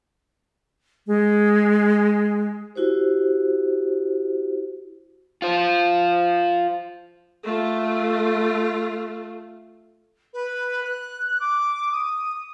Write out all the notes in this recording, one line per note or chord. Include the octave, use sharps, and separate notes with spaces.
G#3
E4 F#4 G4 C5
F4 C5
A3 F4
B4
F#6
D6
D#6